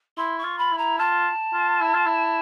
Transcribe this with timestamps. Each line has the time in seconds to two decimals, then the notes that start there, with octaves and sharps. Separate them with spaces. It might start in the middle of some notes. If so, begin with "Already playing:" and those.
0.17 E4 C6
0.38 C#6
0.44 F4
0.58 B5
0.72 E4
0.78 A#5
0.98 F4 A5
1.53 F4
1.81 E4
1.94 F4
2.06 E4